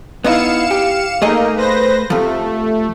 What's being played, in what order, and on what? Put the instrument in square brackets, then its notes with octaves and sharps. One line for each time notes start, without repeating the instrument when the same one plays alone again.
[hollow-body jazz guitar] B3 D#4 E4 [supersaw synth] F5 C#7 E7
[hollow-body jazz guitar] G4
[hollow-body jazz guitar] A3 G#4 D#5 [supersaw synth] A#3 D#4 A#4
[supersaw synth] B4 C5 A#6
[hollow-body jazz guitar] C3 F3 [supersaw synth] A3